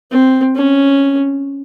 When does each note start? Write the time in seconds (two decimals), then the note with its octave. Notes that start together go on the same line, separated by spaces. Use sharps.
0.11 C4
0.56 C#4